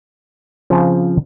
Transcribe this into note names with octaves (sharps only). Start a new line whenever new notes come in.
C#3 F3 C4